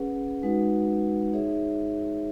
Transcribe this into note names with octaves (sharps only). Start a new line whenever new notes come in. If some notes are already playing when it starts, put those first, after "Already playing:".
Already playing: C#4 G#4 B4 F#5
G#3 D#4 F#4 B4 F#5
D#4 G#4 C#5 E5